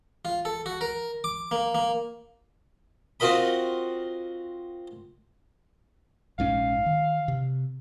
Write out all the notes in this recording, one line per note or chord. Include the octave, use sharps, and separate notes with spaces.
F4
A4
F#4
A#4
D6
A#3
A#3
C4 F4 F#4 A#4 D#5 B5
A#1 G#2 C#4 F5
D#3
C3